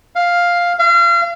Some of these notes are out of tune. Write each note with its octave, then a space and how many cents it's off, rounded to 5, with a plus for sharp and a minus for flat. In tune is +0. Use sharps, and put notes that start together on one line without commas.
F5 +5
F5 -35